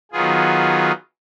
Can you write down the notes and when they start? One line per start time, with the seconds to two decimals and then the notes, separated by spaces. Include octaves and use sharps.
0.12 D#3 F#3 B3 F4 G#4